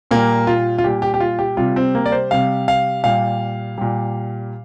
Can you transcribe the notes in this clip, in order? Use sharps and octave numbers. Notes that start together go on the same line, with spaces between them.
A#2 G3 A#3
F4
F4
A#2 G3 G4
G4
G4
F4
G4
C3 G3 F4
C4
A#3
D5
C5
C3 G3 F5
F5
A#2 G3 F5
A#2 G3